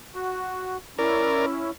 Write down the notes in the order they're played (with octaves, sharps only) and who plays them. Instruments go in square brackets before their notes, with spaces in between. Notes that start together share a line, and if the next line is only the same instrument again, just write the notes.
[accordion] F#4
[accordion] C#4 E4 [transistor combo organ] A#4 D5